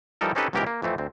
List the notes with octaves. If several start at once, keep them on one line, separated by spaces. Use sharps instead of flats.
E3 F3 G3 D#4 A4 A#4
C4 C#4 D#4 G4 A4 B4
C#2 G#2 B2 E3 G4 A#4
A#3
F2 E3 A3 C4
D2 C4